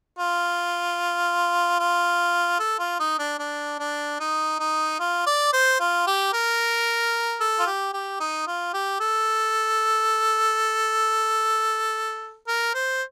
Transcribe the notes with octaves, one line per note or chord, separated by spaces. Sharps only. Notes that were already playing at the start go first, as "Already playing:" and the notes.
F4
F4
A4
F4
D#4
D4
D4
D4
D#4
D#4
F4
D5
C5
F4
G4
A#4
A4
F4
G4
G4
D#4
F4
G4
A4
A#4
C5